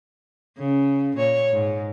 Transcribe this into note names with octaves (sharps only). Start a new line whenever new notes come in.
C#3
A#2 C#5
G#2